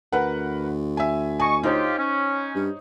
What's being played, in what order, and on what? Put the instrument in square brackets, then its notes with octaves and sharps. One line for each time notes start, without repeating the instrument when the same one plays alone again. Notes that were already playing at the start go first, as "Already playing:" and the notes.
[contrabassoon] D2 [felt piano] A#4 B4 F#5
[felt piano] E5 G#5
[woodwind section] D#5 C#6 [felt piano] G#5
[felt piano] D#4 C5 C#5 [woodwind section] F4 G4
[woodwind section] C#4
[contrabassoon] G2